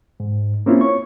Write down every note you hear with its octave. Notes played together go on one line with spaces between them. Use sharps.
G#2
A#3 C4 C#4 E4 F4
C#5 C#6